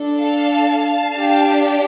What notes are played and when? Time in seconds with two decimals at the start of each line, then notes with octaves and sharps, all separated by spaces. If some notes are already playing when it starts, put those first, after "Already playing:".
Already playing: D4 A4
0.19 F5 A5
0.82 F5 A5
1.14 D4 G4